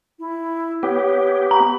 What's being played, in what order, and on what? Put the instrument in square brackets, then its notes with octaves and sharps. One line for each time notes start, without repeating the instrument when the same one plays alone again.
[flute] E4
[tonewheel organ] B3 G4 [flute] C#5
[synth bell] A#5 [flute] B5